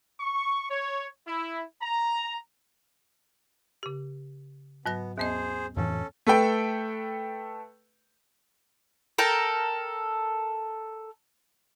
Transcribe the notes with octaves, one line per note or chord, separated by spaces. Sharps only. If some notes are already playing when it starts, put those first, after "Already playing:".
C#6
C#5
E4
A#5
C#3 G4
G#2 F#3 B3 A#6
D#2 B3 G#4 C5 D#5
F2 A2 E3 C#4 A4
A3 A4 B4 G5
A4 A#4 G5